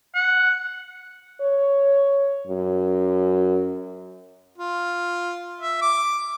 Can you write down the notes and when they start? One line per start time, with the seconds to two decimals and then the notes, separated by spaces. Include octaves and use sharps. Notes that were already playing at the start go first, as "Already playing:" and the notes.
0.15 F#5
1.41 C#5
2.47 F#2
4.58 F4
5.60 E5
5.82 D6